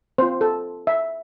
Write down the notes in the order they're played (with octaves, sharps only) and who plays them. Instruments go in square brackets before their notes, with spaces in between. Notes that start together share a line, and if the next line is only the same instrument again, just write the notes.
[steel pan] C4 F4 C5
A4
E5